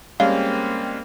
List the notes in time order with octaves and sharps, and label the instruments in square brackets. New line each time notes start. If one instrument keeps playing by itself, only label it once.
[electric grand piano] G3 G#3 C#4 [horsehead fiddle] A#3 C4 [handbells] F5